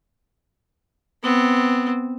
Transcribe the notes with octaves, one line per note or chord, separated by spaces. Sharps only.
B3 C4